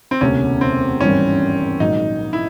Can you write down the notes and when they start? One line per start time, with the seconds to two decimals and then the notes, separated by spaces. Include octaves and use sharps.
0.11 C4
0.21 E1 D2 C3 C#4
0.61 C4
1.01 G#1 G2 E3 G3 C#4
1.80 A#1 G#2 D#3 F#3 A#3 D#4
2.33 E4